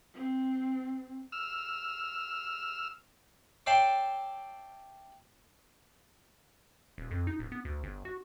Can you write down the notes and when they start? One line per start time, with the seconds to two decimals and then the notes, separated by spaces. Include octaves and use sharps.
0.14 C4
1.32 E6 F6
3.66 C#5 D5 E5 G5 A5 C6
6.98 D#1
7.11 F2
7.27 D#4
7.39 D1
7.52 B3
7.65 D2
7.83 G1
8.05 F#4